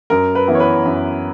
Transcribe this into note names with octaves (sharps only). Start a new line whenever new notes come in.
F#2 A#4
B4
E3 B3 E4
C#5
B4
F#2